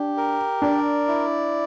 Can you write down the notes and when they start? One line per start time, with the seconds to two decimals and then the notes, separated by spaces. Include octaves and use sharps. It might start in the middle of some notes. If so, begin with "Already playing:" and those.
Already playing: D4 G4
0.17 A#4
0.62 D4 D5
1.08 E4